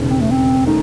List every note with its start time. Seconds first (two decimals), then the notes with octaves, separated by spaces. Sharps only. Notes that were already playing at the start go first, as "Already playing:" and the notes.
Already playing: E1 D#2 C#3
0.09 C4
0.21 A3
0.31 C4
0.67 D#3 A3 C#4 D#4